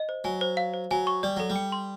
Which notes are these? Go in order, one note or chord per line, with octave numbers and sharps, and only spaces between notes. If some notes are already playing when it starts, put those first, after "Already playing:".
Already playing: D#5
C5
F#3 G#5
C5
F5
C5
F#3 G#5
C#6
G3 D5
F#3 A4
G3
G5
C6